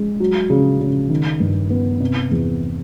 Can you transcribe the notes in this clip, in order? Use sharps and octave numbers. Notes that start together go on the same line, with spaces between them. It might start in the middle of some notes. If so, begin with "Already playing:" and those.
Already playing: G#3
F#3
C#3
C#3
D#3
G2
B3
C3
E2